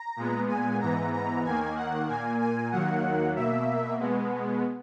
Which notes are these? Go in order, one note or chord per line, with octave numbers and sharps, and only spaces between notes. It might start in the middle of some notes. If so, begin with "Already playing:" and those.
Already playing: A#5
A#2 G#3 B3
G#5
G#2 E3 B3 A#5
A#5
D#2 D#3 A#3 G#5
F#5
A#2 A#3 G#5
G#5
D#2 D#3 F#3 A#3 F#5
B2 A#3 E5
B2 G#3 B3